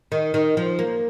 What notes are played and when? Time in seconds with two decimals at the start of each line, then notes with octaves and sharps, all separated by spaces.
0.12 D#3
0.34 D#3
0.57 F3
0.79 A#3